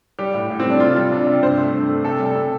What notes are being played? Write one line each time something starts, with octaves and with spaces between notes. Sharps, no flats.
G3 G4
A2
A2
C4
G3
D4
C3 F4
G3
C3 D4
C3
G2 C5
A3
G2
A3
C3 A4
G3
A4
C3